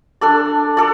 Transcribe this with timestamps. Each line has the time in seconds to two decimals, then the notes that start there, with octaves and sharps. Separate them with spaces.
0.21 D4 A4 D5
0.77 A4 D5